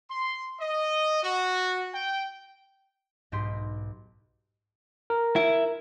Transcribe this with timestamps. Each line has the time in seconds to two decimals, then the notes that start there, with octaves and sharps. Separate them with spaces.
0.10 C6
0.61 D#5
1.24 F#4
1.95 G5
3.32 B1 G#2 G4 D#5 C6 B6
5.10 A#4
5.36 E4